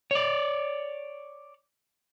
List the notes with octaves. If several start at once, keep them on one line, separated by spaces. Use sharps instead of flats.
C#5 D5